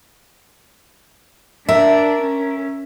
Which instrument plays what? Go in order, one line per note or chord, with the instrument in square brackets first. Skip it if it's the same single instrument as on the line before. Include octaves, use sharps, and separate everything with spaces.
[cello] D4 [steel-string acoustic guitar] A#4 [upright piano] E5
[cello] C#4